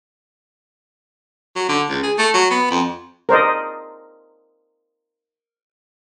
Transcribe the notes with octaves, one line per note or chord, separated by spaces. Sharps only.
F#3
D3
C#2
G#4
A3
F#3
B3
F2
A#4 C5 D5 D#5